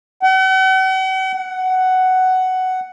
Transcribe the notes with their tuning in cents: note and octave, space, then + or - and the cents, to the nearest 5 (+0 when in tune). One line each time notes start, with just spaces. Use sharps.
F#5 +45
F#5 +10